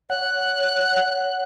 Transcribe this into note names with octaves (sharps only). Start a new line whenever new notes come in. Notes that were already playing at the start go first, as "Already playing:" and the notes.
C#5 F#5 F#6